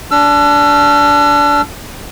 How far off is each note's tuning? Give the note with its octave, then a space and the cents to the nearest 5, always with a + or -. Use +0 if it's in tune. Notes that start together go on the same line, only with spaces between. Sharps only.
D4 -15 E6 +40